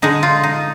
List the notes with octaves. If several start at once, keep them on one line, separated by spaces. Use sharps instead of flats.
D3 G#3 D#4
F4
D#4